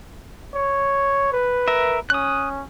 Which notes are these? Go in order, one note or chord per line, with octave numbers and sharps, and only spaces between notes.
C#5
B4
A#4 E5
C#4 D#6 F#6